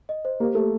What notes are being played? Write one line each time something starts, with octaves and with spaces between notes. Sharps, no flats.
D#5
C5
A#3 G4
A3 G4